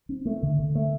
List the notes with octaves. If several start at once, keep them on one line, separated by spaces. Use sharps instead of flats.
C4
A3
D3
D3
A3